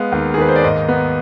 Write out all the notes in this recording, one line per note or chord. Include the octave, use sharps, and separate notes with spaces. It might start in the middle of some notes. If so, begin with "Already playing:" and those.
Already playing: G#3 B3 F5
D#2
G#4
D#3 B4
C5
D5
G#2 D#5
B3